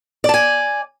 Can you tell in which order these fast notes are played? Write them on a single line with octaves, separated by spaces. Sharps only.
D5 A5 G#5